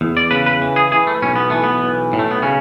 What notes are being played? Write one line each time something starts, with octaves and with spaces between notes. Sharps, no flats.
E2
D5
C#3 B4
B4
E3
G#4
E3 G#4
A3
B1 C#4
B3
E3 A3
B3
B1
A2
A3
B3
C#3 C#4